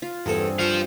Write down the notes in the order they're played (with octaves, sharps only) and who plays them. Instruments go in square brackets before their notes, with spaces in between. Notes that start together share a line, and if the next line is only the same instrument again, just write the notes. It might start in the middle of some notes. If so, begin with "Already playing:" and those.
[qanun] F4
[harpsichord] E2 A4 [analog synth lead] G2 [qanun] C4 G#4
[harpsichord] F3 C#6 [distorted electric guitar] C5 F5